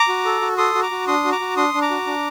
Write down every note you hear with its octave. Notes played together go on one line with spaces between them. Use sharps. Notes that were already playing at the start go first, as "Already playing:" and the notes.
Already playing: A#5 D6
F#4
A4
F#4
A4 C6 D#6
F#4
A#5 D6
F#4
D4 C6 D#6
F#4
A#5 D6
F#4
D4 C6 D#6
D4
A#5 D6
F#4
D4